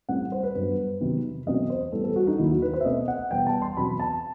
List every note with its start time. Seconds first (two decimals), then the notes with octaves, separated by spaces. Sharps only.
0.09 A2 G3 C4 F#5
0.32 C5
0.43 B4
0.55 G2 F#3 B3 B4
1.00 E2 C3 D#3 F#3 C4
1.46 E2 B2 F#3 A3 C4 D#5
1.70 C5
1.92 A2 E3 G3 B3 A4
2.04 A4
2.16 F#4
2.27 D#4
2.39 D#2 D#3 F#3 E4
2.51 F#4
2.62 B4
2.74 C5
2.81 E5
2.84 B2 A3 C4 D#5
3.08 F#5
3.31 E2 B2 G3 B3 G5
3.47 A5
3.62 C6
3.77 E2 B2 F#3 C4 B5
4.00 A5